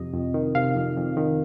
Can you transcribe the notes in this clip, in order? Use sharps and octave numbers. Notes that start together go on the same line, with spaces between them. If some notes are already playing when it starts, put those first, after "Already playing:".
Already playing: F2 C3 D#5
F2
D#3
C3 F5
F2
F2
D#3